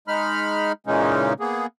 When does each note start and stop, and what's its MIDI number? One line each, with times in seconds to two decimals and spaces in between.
0.08 0.72 56
0.08 0.72 63
0.08 0.72 83
0.08 0.72 89
0.87 1.33 46
0.87 1.33 49
0.87 1.33 52
0.87 1.33 56
0.87 1.33 61
0.87 1.33 63
1.40 1.66 58
1.40 1.66 59
1.40 1.66 68